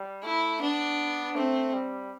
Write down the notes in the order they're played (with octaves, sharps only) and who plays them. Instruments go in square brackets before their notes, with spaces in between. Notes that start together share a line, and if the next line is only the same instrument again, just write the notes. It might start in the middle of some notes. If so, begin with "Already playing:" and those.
Already playing: [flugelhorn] G3
[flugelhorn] A3 [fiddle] E4
[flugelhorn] B3 [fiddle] D4
[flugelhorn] A3 [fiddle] C4
[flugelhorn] G3